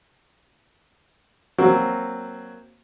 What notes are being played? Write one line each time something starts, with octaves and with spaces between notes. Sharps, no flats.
F#3 A#3 C4 F#4